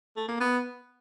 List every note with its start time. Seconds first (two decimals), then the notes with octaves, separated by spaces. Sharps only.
0.16 A3
0.28 A#3
0.40 B3